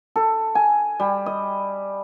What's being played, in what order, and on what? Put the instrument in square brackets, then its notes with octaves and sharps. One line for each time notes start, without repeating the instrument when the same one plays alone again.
[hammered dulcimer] A4
G#5
G3
D#5